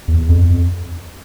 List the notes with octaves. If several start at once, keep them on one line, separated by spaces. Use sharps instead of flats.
E2
F2